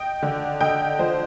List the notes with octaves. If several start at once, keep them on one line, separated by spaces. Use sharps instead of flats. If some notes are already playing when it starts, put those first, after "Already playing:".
Already playing: D#5 G5
D3
D3 D#5 G5
F3 C5 D#5